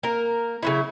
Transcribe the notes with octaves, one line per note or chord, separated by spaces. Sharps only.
A#3 A#4
C#3 F#3 E4